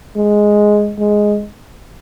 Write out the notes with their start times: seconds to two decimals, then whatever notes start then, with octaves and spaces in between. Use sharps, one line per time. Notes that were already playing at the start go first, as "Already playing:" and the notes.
0.16 G#3
0.99 G#3